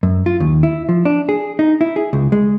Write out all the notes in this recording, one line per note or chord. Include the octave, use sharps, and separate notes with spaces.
F#2
F4
D#2
E4
F3
D4
G#4
D#4
E4
G#4
C#2
G#3